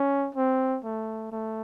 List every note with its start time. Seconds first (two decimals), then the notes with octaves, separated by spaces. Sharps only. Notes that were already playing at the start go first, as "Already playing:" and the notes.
Already playing: C#4
0.35 C4
0.84 A3
1.32 A3